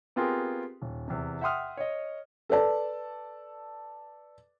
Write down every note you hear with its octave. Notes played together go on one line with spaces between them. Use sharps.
B3 C4 F4 G4 G#4 A#4
D#1
E2 C3
E5 F#5 G5 C6 D#6 F6
C#5 D#5
A4 B4 D5 A5